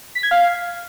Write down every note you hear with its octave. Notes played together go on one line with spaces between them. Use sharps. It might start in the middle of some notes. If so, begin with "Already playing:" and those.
B6
G#6
F5